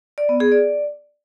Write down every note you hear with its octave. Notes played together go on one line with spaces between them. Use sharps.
D5
B3
G#4
D5